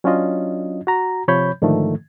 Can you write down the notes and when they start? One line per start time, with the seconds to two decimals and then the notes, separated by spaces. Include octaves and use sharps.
0.04 F#3 C#4 D4 F4 D#5
0.87 F#4 A#5
1.28 C3 F3 C#5 B5 G6
1.62 G#2 D3 D#3 F3 A3